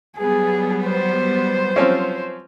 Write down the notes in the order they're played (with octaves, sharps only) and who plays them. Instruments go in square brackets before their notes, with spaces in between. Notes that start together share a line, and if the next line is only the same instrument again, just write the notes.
[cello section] F#3 G3 B3 [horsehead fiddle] G#4
[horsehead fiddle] C5
[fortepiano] F3 C4 C#4